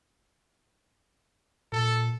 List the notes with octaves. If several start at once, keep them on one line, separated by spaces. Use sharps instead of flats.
A#2 A4